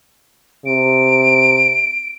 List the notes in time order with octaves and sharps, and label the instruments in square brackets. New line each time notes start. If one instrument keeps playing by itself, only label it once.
[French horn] C3 [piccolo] D7